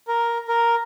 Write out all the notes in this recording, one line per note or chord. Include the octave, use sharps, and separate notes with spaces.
A#4
A#4